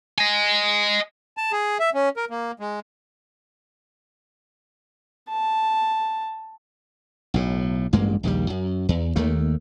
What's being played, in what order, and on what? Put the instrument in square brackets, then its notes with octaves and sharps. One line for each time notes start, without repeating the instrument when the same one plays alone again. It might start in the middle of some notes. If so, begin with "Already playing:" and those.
[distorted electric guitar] D#5 G#5
[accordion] A5
G#4
E5
C#4
A#4
A#3
G#3
[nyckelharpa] A5
[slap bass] B1 A2
A1 G2 G#3 A#3
A#1 D#2 D#3 G3
F#2
E2
D#2 D#3 A3 A#3